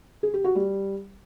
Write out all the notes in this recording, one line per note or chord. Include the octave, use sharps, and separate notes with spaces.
G#4
G4
F#4
G3